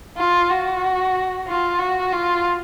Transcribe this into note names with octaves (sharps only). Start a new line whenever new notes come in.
F4
F#4
F4
F#4
F4